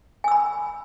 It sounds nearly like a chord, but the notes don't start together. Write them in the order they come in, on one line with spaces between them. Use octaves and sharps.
G#5 E6 B5